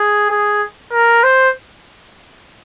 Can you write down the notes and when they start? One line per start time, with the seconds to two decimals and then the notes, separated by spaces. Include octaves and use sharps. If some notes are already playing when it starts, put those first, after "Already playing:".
Already playing: G#4
0.30 G#4
0.92 A#4
1.23 C5